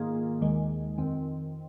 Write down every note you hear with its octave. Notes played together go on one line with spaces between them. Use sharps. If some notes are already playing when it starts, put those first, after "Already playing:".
Already playing: G#2 D#3 A#3 F4 G#4
D#2 D#3 G#3
F2 D#3 C4